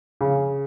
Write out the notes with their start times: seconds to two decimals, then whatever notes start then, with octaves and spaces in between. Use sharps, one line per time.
0.21 C#3